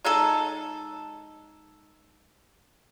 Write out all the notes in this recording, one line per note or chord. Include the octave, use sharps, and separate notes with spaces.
G#3 D#4 A4